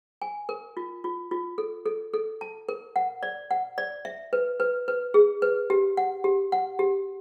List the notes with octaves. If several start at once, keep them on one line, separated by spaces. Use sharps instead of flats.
G#5
A#4
F4
F4
F4
A4
A4
A4
A5
A#4
F#5
D5
F#5
D5
E5
B4
B4
B4
G#4
B4
G4
F#5
G4
F#5
G4